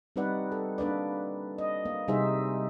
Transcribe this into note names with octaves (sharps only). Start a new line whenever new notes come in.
G3 C4 D#4 B4 D5 F#5
A4
A#3 D4 B4 D5
D#5
A#3
C3 G3 D#4 G#4 C5 E5